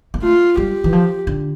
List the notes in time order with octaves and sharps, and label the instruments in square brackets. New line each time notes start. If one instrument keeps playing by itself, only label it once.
[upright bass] A#3
[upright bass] A3 [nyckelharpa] F4
[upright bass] G3 [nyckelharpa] G4
[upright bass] E3
F3
D3